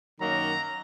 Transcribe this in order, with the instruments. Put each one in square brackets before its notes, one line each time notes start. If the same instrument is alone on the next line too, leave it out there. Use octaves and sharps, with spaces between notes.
[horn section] F#2 D#3 F#3 A#3 A#5